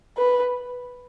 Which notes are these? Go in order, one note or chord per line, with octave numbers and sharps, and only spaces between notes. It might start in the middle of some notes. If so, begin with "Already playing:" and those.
B4